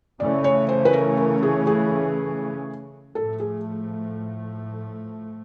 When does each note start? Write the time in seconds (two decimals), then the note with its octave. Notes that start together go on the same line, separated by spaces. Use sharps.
0.19 C#3 E3 A3 C#4 D5
0.44 C#5
0.69 C5
0.85 B4
0.93 A#4
1.18 A#4
1.43 G#4
1.67 G#4
3.15 A2 F3 A3 A4
3.40 G#4